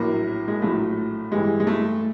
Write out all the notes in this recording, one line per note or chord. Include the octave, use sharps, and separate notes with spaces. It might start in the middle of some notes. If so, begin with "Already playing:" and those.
Already playing: A#1 A2 F#3 A#3
G#3
A#1 A2 F#3 A3
G2 E3 G3 G#3
G#3
A3